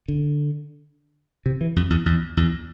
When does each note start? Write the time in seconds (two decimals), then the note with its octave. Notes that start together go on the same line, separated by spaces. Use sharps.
0.08 D3
1.46 C3
1.61 E3
1.76 F2
1.90 E2
2.06 E2
2.37 E2